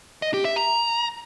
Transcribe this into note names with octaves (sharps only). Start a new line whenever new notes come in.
D#5
G4
E5
A#5